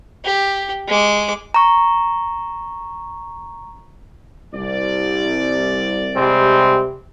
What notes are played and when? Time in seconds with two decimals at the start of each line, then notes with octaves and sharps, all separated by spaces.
0.25 G4
0.88 G#3 D6
1.54 A#5 C#6
4.53 C2 D5
6.15 C3 G3 G#3 C4